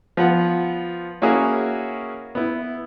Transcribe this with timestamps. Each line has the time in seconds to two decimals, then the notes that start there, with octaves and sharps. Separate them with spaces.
0.17 F3 B3 F#5
1.22 A#3 C#4 E4 F#4 G#4 A#4
2.35 B3 E4